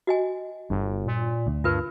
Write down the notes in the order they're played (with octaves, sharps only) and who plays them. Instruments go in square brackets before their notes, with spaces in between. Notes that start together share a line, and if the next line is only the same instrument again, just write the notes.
[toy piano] F#4 D#5 G#5
[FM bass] G1 [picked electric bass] G2
[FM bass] A#2
[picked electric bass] D2
[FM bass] G2 [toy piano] F4 A#4 B4